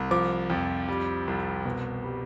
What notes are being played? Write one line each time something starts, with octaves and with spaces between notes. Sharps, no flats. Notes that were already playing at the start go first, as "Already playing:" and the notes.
Already playing: C2
F3 D6
F2
G3
C2
B2
G3